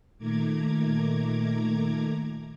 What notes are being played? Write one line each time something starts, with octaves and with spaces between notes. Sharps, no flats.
A#2 D#3 A3 A#5 D6 G#6